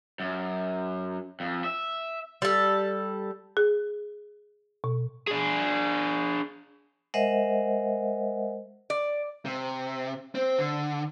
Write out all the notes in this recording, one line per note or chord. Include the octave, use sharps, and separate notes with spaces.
F#2
F2
E5
G3 A4
G#4
B2
D4 G#4
G#3 A#4 C5 D#5 E5 F#5
D5
C3
C4
D3